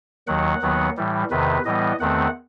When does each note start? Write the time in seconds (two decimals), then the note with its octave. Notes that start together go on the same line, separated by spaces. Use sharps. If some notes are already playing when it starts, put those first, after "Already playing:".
0.27 D#2 D#3 F#3 F#5
0.62 D#2 D#3 F#3 B3
0.97 A2 E3 G3
1.31 E2 C3 D#3 B4
1.65 A2 E3 G3 B3 D#5
2.00 E2 D#3 A3 C4 F#5